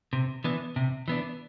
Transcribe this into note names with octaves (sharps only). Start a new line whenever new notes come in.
C3
E3 B3 D4
C3
E3 B3 D4